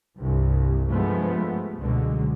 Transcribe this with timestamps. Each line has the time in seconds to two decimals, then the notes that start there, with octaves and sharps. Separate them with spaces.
0.16 C2 G2
0.90 G2 F3 G#3 A3 B3
1.79 C#2 B2 D3 F#3 G#3